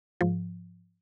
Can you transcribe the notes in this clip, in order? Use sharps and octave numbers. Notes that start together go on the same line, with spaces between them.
G#2 F3